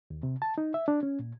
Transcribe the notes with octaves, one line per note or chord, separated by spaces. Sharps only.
D#2
C3
A5
D#4
E5
D4
C#4
A#2